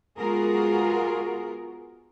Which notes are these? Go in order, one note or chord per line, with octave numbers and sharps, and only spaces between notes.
G#3 B3 F4 F#4 G#4 A#4